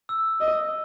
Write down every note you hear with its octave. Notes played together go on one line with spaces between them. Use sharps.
E6
D#5